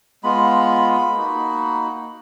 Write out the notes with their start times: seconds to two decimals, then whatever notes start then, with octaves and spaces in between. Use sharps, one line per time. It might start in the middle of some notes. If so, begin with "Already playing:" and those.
0.24 G#3 B3 F4 B5
1.14 A#3 D#4 F#4